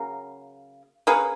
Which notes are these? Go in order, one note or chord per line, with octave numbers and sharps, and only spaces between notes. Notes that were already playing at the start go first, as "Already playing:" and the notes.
Already playing: C#3 F#3 A#3
A#3 C#4 G#4 B4